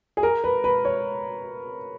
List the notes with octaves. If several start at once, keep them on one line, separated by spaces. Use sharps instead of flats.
G#4
A#4
B4
B4
C#5